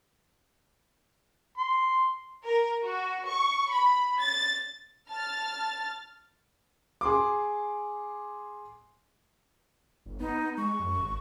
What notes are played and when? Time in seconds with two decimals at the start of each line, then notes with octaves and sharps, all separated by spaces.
1.58 C6
2.44 A#4
2.84 F#4
3.26 C#6
3.71 B5
4.20 A6
5.10 A5 F6 A6
7.01 G#4 C6 D6
10.06 G1
10.20 B3 D#4
10.58 G#3 C#6
10.80 F#2
10.97 G#1